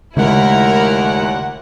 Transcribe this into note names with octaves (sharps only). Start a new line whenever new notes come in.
D#2 A#2 C#3 G#3 A3 E4 A#4 F#5